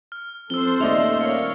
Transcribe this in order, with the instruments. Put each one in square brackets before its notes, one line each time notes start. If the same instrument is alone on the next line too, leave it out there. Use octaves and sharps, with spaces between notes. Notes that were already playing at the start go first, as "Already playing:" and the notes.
[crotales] F6
[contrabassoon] F2 [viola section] A4 C5 [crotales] E6 G7
[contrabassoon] D#1 [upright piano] A3 D5 D#5 [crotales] F7
[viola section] A#4 C#5 F5 [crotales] C#7